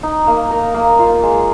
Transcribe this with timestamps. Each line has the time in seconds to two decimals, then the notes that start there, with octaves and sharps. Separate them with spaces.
0.03 D#4
0.27 A#3
0.51 A#4
0.74 A#3
0.99 F4
1.23 G#3